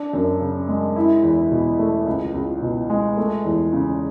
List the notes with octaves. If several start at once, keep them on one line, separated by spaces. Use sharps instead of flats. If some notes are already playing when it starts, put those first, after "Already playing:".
Already playing: D4
F#2
C#3
G#3
E4
E2
B2
A3
C#2
C#2
B2
G#3
A3
E2
C#3